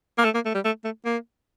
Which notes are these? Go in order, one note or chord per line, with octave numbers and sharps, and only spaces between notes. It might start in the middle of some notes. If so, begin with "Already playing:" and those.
A#3
A3
A#3
A3
G3
A3
A3
A#3